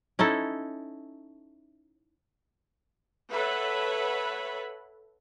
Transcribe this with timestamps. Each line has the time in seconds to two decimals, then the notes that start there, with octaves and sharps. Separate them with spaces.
0.19 C#4 D#4 E4 A4
3.32 A4 B4 C#5 E5 F#5 B5